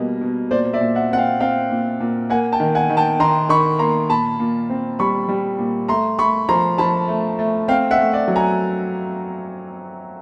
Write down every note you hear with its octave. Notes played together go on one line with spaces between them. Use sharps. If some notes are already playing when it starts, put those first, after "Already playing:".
Already playing: B2 G3 A#3 D#5
B2
A#2 C5 D5
D5 E5
A#2
E5 F#5
C4 F#5
F5 G5
C4 F5 G5
A#2
A#2
A#3 F#5 G#5
G5 A5
D#3
F#5 G#5
D#3
G5 A5
D#3 A#5 C6
D#3 B5 C#6
A#3 A#5 C6
A#2 A5 B5
A#2
C4
G3 B5 C#6
G3
A#2
A3 A#5 C6
A3 B5 C#6
F3 A#5 C6
F3 A5 B5
A3
A3
C4 F5 G5
E5 F#5
A3
D5 E5
F#3
G#5 A#5